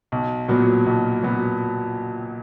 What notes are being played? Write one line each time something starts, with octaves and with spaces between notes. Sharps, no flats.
B1
A#2 F#3 B3
B1
A#2 F#3 B3